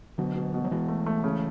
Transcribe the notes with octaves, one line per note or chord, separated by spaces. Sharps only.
B2 D3 F#3
B2
B2
F#3
B2 E3 G#3
A3
A3
C#3